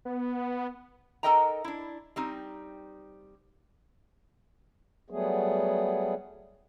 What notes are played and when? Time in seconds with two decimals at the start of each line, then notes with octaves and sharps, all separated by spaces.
0.05 B3
1.23 D#4 A4 A#4 D#5 G5 A#5
1.64 D4 E4
2.16 G3 C4 D#4
5.10 F#3 G3 A3 B3 G#4